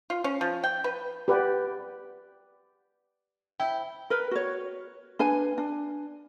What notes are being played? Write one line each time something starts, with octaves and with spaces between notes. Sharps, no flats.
F4
C#4
F3
G5
B4
G4 B4 D5 F#5 G5
E4 G5
A#4 B4
F#4 C#5
D4 B4 G#5
D4